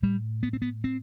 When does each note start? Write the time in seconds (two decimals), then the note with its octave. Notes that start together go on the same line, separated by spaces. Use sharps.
0.02 A2 G3
0.43 B3
0.53 C4
0.62 B3
0.84 C4